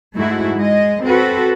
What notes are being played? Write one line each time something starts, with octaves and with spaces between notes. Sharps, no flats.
G#2 A3 E4 F#4 G#4
G#3 D#5
C4 F#4 A4 B4